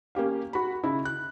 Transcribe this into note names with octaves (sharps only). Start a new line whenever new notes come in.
A#3 C#4 G4 F5
F#4 B5
C#3 E4
F#6